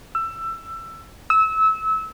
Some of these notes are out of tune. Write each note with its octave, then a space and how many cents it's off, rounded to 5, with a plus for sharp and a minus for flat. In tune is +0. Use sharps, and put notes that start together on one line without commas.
E6 +20
E6 -25